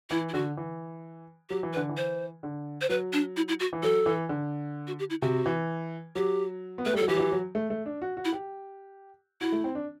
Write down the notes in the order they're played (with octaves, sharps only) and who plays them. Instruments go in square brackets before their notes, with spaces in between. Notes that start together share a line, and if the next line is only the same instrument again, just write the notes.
[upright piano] E3 [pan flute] E4
[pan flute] E4
[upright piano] D3 [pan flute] F#4
[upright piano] E3
[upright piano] F#3 [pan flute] G4
[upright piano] E3
[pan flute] B4
[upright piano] D3
E3
[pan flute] C5
[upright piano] D3
[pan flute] C5
[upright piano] F#3 [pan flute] B4
[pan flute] D4
E4
E4
F#4
[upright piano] E3
[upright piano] F#3 [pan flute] A4
[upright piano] E3
D3
[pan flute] F#4
G4
E4
[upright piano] C3 [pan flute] F#4
[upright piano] E3
[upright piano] F#3 [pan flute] G4
[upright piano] B3
[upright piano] A3 [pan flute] B4
[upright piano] G3
[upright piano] F#3 [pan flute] A4
[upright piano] E3 [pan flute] G4
[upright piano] F#3
E3
F#3
A3
A3
D4
F#4
F#4
[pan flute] E4
[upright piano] G4
[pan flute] E4 [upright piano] F#4
[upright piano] A3
C4
D4